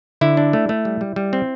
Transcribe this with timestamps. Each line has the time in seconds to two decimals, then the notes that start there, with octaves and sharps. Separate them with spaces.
0.21 D3 E4
0.37 D4
0.53 A3
0.69 A3
0.85 G3
1.01 G3
1.16 G3
1.33 C4